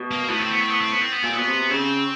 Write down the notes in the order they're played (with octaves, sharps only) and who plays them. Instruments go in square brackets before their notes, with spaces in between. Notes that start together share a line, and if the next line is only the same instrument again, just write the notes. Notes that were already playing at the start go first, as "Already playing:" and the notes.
Already playing: [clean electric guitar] B2
[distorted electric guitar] A#3
[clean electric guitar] A2 [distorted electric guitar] B3
[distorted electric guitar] C4
B3
C4
B3
C4
B3
C4
B3
[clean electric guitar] A#2 [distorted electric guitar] C4
[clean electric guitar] B2 [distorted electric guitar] B3
[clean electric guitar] C3
[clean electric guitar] C#3 [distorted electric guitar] C4